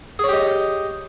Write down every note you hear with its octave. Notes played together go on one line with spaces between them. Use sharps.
G4 G#4 C#5 D#5